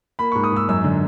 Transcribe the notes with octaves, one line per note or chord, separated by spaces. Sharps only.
A#3 B5
G#2 C#6
D#6
G#2 E6
F#2 E6
D3